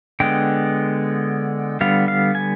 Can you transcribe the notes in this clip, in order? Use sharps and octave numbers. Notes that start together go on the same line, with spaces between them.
D3 G#3 B3 G5
D3 G3 B3 F5
F5
G#5